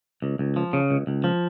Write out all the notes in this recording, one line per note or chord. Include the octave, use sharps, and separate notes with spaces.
C#2
C#2
F3
C#3
C#2
C#2
F3